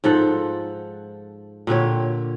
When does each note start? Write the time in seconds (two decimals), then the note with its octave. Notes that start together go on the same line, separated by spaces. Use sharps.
0.04 G#2 F3 A4 F#5
1.67 A#2 D3 G4 C#5